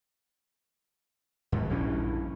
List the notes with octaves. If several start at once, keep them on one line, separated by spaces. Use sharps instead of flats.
D#2 G#2 B2
A#1 G2 E3 C#4